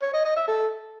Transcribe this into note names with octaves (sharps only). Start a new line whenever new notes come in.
C#5
D#5
D#5
E5
A4